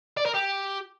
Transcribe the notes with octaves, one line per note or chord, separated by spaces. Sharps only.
D5
A#4
G4